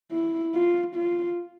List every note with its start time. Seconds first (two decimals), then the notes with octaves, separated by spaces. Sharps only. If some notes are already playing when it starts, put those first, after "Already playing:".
0.12 E4
0.54 F4
0.96 F4